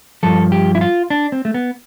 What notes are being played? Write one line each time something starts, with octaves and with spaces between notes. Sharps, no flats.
G2 F3 A4
G4
E4
F4
D4
C4
A3
B3